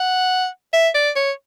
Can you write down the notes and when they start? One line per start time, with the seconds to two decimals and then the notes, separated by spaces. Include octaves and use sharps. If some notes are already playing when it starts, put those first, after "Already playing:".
Already playing: F#5
0.73 E5
0.95 D5
1.16 C#5